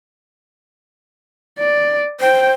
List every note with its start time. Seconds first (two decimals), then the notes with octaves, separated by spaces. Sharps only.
1.59 D5
2.21 C5 G5